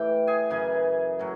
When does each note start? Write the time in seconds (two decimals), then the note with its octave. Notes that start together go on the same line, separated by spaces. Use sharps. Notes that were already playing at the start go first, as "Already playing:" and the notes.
Already playing: A2 E3 G4 G5
0.27 G#4 G#5
0.50 F#2 C#3 E3 G#4 G#5
1.19 A2 F#3